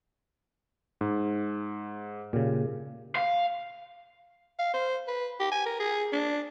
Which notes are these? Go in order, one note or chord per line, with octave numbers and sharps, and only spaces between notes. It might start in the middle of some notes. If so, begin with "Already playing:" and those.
G#2
A#2 C#3 G4
F5
F5
C5
B4
G4
G#5
A#4
G#4
D4